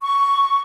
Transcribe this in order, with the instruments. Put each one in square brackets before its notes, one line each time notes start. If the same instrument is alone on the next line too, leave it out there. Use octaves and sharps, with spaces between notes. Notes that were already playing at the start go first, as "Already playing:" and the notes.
[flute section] C#6